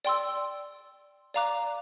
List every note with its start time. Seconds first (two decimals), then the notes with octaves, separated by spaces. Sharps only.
0.05 D5 G5 C6 E6
1.34 D5 F5 A#5 D6 F#6